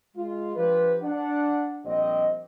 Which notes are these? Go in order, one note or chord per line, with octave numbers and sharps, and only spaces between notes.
G#3 F4
F3 D4 F4 G4 B4
D4 F#5
A#1 G3 C4 G4 D#5